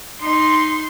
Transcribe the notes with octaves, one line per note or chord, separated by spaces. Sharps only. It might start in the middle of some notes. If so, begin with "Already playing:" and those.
D#4 C6